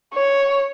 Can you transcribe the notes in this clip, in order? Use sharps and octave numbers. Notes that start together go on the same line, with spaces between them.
C#5